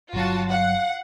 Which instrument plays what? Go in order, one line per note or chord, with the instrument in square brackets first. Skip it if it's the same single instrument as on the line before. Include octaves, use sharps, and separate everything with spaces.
[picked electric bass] G1 F#3 [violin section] F4 F#4 A5
[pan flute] F5 [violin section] F#5